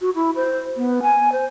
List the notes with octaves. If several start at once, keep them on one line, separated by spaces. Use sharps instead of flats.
F#4
E4
C5
B3
G#5
C5